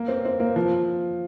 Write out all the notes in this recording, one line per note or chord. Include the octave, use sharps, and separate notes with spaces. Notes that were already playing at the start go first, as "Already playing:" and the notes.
Already playing: A#3
C4
C4
A#3
F3